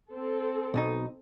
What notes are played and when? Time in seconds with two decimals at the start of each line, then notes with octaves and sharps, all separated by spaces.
0.10 C4 A4
0.74 B1 B2 D#4